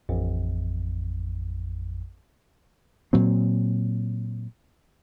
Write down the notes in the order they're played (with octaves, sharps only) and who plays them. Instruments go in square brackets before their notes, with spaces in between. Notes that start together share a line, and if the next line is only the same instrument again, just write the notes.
[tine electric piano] A1 F2
[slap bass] A#2 F#3 C4